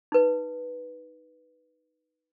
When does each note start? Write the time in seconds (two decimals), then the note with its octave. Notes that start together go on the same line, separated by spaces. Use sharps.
0.12 D#4 B4